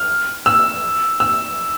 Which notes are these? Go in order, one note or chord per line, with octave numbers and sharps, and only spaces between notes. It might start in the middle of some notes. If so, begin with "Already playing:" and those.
Already playing: F6
E6
E6